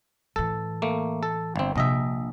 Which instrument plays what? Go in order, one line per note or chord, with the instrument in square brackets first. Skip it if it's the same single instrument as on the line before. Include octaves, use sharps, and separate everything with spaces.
[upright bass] A2 E3 [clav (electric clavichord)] A4
[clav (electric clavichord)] A3 A#3
A4
G1 C4
[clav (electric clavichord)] A#1 D#5 E5 [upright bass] C3 D4